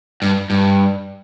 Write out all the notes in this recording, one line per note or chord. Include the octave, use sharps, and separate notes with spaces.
G2
G2